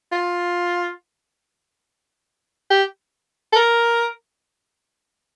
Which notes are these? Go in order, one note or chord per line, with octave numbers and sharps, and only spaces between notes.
F4
G4
A4
A#4